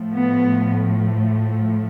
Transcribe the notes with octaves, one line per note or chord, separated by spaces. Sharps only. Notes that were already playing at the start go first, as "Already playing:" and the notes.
Already playing: A2 F3 A3
B3